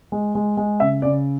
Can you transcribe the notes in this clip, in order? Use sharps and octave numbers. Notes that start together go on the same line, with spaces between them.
G#3
G#3
G#3
C#3 E5
C#3 D5